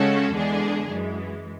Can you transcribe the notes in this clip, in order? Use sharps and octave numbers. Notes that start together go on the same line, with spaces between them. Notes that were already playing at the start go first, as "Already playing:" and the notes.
Already playing: C#3 G#3 C#4 F#4 A4
E2 D3 G#3 D4 G#4
F#2 E3 G#3